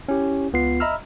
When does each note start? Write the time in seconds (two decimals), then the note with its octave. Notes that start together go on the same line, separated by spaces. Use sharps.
0.08 C#4 E4 G4
0.53 C#2 B3 F4 C7
0.80 D#5 E5 A#5 B5 E6 F6